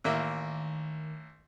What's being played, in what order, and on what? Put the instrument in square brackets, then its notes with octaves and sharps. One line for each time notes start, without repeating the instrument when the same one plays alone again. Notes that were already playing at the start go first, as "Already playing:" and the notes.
[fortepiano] A1 A#3 E5 [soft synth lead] D#3